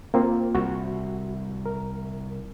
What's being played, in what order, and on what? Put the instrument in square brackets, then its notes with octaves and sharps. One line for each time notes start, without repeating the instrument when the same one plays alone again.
[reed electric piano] A#3 C4 F4
[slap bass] C2 [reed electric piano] F#4
[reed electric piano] A#4